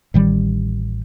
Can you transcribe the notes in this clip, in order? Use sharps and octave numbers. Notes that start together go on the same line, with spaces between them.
A1 D#3 G3